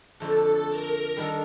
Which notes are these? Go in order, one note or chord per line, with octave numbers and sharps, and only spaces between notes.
F2 D3 A3 D4 A4
A#4
D#3 G3 D4 A4